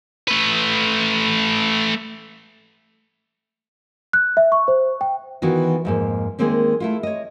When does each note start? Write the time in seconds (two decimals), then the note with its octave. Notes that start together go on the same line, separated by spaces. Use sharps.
0.27 A3 B4
4.13 F#6
4.37 E5
4.52 C#6
4.68 C5
5.01 G5
5.42 D#3 E3 B3 F4 F#4
5.85 F2 G#2 A#3
6.39 D#3 G#3 A#3 C4 C#4
6.80 A3 E4 F4
7.03 C#5 D#5